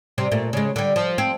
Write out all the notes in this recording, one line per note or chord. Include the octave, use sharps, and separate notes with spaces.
C3 G3 C4
A#2 A3
C#3 G#3
D3 G3
F3
C4